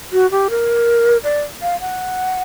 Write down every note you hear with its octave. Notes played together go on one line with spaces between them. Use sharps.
F#4
G4
A#4
D5
F5
F#5